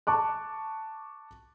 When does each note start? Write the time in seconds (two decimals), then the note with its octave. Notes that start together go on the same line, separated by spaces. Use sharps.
0.07 A5 C#6 D6 F#6